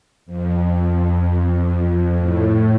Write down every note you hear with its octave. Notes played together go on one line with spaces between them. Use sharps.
F2
A2